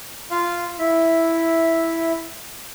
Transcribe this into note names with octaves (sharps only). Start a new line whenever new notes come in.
F4 F5
E4 E5